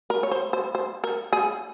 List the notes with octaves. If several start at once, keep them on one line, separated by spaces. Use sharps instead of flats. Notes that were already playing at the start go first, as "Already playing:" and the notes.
A#4
C#5
C5
C5
C5
A#4
G#4